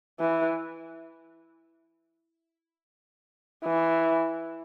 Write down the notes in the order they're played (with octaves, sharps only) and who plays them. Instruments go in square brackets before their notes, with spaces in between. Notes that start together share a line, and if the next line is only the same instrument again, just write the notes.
[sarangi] E3
E3